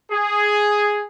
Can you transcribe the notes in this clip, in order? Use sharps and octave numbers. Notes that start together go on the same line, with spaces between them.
G#4